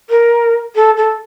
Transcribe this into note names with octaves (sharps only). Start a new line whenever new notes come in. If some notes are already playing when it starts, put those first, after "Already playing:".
A#4
A4
A4